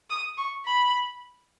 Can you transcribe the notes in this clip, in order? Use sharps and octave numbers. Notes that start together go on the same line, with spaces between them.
D#6
C#6
B5